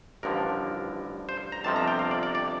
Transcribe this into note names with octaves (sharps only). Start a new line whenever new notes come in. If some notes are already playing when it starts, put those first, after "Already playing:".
A1 G2 D3 F3 A#4
C5
A#5
G1 F2 C3 F3 A5
A#5
G5
F5
D5
D5
D5